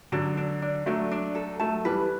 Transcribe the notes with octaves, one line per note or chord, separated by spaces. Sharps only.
D3 F#3 D4
D4
D4
F#3 A3 D4
D4
A4
F#3 A3 A5
E3 G3 B4